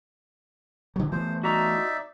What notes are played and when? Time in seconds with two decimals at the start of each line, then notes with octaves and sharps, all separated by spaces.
0.96 D3 F#3
1.12 E3 A3 B3 C5
1.43 D#4 F#4 D5 E5 A#5